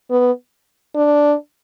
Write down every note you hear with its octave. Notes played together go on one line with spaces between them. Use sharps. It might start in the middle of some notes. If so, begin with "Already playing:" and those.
B3
D4